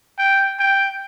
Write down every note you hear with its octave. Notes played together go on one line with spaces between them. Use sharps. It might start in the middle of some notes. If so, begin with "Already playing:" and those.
G5
G5